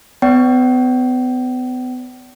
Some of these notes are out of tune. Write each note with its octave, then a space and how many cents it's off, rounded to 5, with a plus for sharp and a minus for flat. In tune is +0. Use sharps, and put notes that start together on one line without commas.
B3 +35 D5 -40 G5 -45